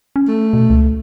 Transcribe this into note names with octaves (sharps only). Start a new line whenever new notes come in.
C#4
A3
B2
C#2